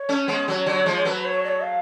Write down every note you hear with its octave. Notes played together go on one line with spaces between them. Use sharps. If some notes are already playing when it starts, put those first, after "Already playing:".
Already playing: C#5
A3 C#4
G#3 B3
F#3 A3
D3 F#3
F3 G#3
F#3 A3 B4
C#5
D5
C#5
F5